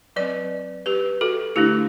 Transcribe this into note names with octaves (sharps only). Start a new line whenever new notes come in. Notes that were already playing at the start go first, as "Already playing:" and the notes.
F#3 C4 B4 D5
G4 B4
F#4 A4
D3 A3 D4 E4 G4